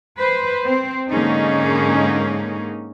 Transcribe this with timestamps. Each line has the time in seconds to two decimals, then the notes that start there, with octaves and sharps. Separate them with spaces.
0.19 B4 C5
0.64 C4 C5
1.09 G#2 D3 A#3 C#4 D#4 G#4